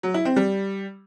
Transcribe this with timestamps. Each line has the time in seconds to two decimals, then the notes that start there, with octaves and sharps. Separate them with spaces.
0.03 F#3
0.14 E4
0.25 C4
0.36 G3